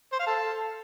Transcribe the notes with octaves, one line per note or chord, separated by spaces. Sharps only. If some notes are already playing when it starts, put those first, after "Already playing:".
C5
F5
A4